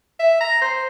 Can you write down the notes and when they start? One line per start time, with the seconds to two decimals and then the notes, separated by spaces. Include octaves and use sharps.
0.20 E5
0.41 A#5
0.62 C5